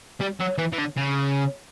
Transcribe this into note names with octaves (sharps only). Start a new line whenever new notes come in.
G3
F#3
E3
E3
D3
C#3